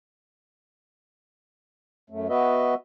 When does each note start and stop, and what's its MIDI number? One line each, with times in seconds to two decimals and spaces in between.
2.10 2.28 42
2.10 2.28 57
2.29 2.74 59
2.29 2.74 66
2.29 2.74 71
2.29 2.74 75
2.29 2.74 76